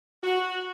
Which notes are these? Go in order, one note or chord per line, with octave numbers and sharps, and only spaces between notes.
F#4